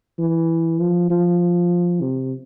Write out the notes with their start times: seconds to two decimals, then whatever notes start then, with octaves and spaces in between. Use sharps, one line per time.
0.19 E3
0.80 F3
1.10 F3
2.01 C3